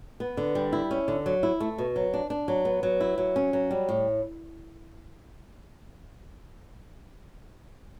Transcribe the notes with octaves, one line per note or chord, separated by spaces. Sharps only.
B3
D3
G3
E4
C#4
D3
F#3
E4
A3
B2
F#3
D4
D4
F#3
B3
F#3
E4
F#3
C#4
F#3
G3
A2